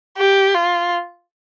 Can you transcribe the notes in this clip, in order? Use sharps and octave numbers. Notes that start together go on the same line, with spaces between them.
G4
F4